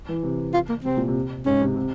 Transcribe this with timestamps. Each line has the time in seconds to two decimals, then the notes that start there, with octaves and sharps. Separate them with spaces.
0.09 E3
0.23 C3
0.54 F4
0.69 A#3
0.84 C3 C4
0.97 A#2
1.08 C3
1.46 G#2 C#4
1.61 C3
1.76 C3